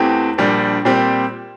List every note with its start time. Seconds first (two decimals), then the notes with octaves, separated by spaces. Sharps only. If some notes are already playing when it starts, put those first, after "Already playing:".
Already playing: E2 E3 A3 C4 G4
0.38 A#1 A#2 G3 D4
0.85 A#2 G3 C4 G4